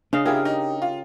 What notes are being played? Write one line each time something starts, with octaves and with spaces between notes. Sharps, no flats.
C#3 D4 D#5 F5
E4 F4 G4 G#4 A#4
D#4
F4